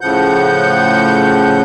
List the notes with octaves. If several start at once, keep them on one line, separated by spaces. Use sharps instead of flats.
A2 C#3 F3 F#5 G6